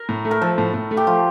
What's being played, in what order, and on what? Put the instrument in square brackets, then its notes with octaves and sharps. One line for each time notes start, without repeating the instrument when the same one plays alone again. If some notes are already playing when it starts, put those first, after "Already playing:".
Already playing: [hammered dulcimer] A#4
[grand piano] A2
A3
[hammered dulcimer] A#4
[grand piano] F3 [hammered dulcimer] A4
[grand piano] A2
A2
A3
[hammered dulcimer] G4
[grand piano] F3 [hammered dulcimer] F4